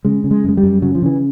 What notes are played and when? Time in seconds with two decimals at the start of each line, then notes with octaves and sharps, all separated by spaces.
0.05 C#3 G#3
0.24 C#3
0.31 G#3
0.44 F#2 G#3
0.57 G3
0.63 F#2
0.82 C#3 F#3
0.95 F3
1.02 C#3 E3